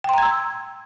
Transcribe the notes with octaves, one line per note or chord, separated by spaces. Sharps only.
G5 A#5 C6 E6 G#6